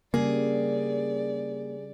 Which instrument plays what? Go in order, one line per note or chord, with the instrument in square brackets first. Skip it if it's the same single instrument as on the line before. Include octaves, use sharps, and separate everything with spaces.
[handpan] C#3 G3 [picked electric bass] A#3 [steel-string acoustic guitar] G#4 [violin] D5